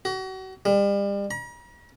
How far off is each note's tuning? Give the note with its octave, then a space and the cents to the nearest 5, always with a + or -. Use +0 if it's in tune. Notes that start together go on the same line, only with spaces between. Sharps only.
F#4 +35
G3 +35
A#5 +45